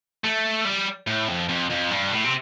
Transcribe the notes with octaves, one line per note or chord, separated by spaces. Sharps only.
A3
G3
A2
F2
F2
F2
G2
A2
C3